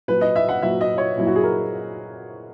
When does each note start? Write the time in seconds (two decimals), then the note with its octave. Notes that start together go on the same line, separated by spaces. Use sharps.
0.08 A#2 F#3 B4
0.21 D#5
0.36 E5
0.49 F#5
0.62 A#2 F#3 E5
0.81 D#5
0.98 C#5
1.17 A#2 F#3 E4
1.27 F#4
1.36 G#4
1.44 A#4